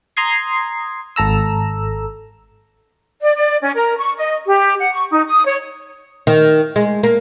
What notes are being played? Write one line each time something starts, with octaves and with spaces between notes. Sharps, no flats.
A#5 C6 D#6 G#6 C7
G#1 A4 A#5 E6
D5
D5
C#4
A#4
C#6
D#5
G4
F#5
C#6
D#4
D#6
C#5
D#3
G#3
A#3